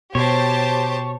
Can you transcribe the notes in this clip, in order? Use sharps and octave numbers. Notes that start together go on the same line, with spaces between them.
B2 G4 C5 C#5 A5